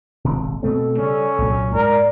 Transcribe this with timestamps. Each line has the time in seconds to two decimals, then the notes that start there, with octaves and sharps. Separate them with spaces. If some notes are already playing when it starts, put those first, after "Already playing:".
0.24 D#1 G#1 C3
0.63 B2 A3 C4 A4
0.98 C#3 G3 C#4
1.38 C2 A#2 F#3
1.74 G#2 A#4 D5